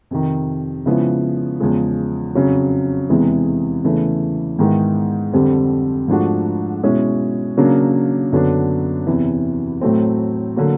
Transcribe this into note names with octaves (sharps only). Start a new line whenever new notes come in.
F2 C3 D#3
C#3 F3 G#3 B3 E4
E2 C#3 F3 G#3
F2 C#3 F#3
E2 C3 E3 G#3
E2 C#3 E3 A3
G#2 D#3 G#3 B3 E4
F2 D3 G3 C4
G#2 F3 A3 D4 F#4
B2 G#3 C#4 E4
C#3 F#3 A#3 D4
F#2 D3 F#3 B3 D4
E2 C3 E3
A2 F#3 A3 C4
D3 F#3 A#3